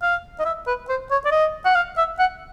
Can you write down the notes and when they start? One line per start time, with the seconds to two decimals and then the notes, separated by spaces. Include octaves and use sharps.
0.02 F5
0.39 D#5
0.45 E5
0.67 B4
0.89 C5
1.11 C#5
1.25 D5
1.32 D#5
1.65 F#5
1.75 F5
1.97 E5
2.19 F#5